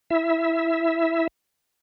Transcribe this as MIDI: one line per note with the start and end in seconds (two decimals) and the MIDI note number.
0.10 1.27 64
0.10 1.27 76